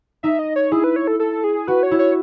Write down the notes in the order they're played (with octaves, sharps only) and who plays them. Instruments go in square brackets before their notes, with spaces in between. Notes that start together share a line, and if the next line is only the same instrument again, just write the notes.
[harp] D#4 [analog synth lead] E5
[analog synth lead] D#5
C#5
[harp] E4 [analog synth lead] G#4
[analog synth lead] B4
C#5
A4
A4
G#4
[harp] F#4 [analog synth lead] B4
[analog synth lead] C#5
[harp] E4
[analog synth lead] C#5